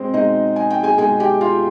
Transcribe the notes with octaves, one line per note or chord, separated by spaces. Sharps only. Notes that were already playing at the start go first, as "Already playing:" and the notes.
Already playing: B2 G#3 C4 G#4 C5
B2 G#3 D#4 D#5
G#5
G5
G#4 G#5
B2 G#3 G#4 G#5
G4 G5
F4 F5